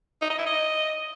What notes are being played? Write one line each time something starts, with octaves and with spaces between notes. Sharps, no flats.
D#4
D#5
E4
D#5